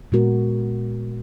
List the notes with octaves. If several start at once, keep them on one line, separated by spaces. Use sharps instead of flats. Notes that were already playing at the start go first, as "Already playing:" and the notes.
A#2 G#3 B3 F#4 A#4